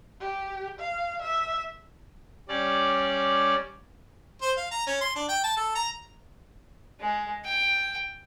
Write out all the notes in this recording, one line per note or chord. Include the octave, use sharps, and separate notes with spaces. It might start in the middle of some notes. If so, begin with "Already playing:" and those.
G4
F5
E5
G3 C#4 D5
C5
F5
A#5
C#4
C6
D4
G5
A5
A4
A#5
G#3
G5